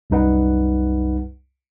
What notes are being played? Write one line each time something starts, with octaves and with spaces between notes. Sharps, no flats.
C2 F#2 G3 D#4 B4 F#5